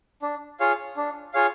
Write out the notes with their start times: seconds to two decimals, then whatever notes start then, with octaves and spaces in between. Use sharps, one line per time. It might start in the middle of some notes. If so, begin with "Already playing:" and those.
0.22 D4
0.60 F4 G#4 C#5 F5
0.96 D4
1.33 F4 G#4 C#5 F5